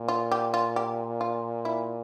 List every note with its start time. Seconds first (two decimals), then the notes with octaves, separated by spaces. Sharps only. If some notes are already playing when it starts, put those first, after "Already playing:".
Already playing: A#2
0.08 F4
0.32 G4
0.54 F4
0.76 G4
1.21 F4
1.65 E4